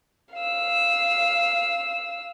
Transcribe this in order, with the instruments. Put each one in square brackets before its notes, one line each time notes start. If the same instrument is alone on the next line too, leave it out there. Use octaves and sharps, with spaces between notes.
[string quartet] F5 E6